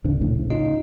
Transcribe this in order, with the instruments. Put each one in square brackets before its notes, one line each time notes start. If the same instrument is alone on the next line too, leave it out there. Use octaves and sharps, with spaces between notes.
[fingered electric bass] A1 C#3 D4 [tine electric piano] D2
[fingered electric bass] A#1 A2 C#3
[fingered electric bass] C#3 [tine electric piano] D#4 F4 D#5